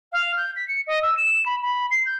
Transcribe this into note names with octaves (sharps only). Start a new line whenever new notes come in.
F5
G6
B6
C#7
D#5
E6
E7
B5
B5
C7
G6